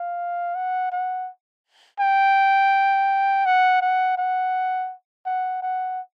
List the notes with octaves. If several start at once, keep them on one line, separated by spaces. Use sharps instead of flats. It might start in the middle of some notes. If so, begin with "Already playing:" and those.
Already playing: F5
F#5
F#5
G5
F#5
F#5
F#5
F#5
F#5